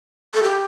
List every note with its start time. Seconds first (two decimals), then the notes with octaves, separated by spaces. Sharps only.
0.34 A4
0.43 G4